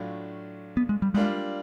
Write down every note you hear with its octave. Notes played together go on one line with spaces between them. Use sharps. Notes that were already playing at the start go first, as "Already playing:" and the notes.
Already playing: A2 F#3 A3 D4 F4
B3
G#3
G3
G3 G#3 A#3 D4 F4